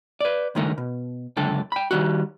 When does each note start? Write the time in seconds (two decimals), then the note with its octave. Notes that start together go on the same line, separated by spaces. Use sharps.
0.21 B4 D5
0.55 C#2 G2 D#3 A3 A#4
0.78 B2
1.37 C#2 F#2 D3 A4 G5
1.72 G5 B5
1.91 D#3 E3 G3 F#4